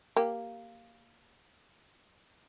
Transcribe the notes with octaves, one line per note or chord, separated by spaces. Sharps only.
A#3 G4